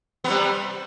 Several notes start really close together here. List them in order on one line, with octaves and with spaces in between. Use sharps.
B3 C3 G3